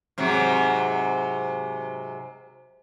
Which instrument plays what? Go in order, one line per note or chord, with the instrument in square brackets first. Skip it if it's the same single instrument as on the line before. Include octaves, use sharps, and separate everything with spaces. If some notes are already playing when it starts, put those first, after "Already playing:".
[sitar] G#2 C3 F#3